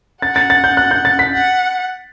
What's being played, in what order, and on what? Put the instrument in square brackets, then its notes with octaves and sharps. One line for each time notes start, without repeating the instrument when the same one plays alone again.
[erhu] F#5 [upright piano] A6
[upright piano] A6
A6
G6
F#6
G6
A6
B6
[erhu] F#5